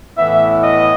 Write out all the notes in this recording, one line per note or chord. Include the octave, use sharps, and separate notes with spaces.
A2 E3 B3 E4 E5
D#5